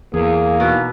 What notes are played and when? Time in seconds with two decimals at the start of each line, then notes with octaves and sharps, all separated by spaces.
0.14 E2 A#3 G#4
0.60 B2 D#4